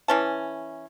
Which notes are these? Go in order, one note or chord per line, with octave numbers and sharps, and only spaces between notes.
E3 C#4 A5